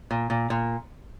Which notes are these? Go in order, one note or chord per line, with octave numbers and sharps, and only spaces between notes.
A#2
A#2
A#2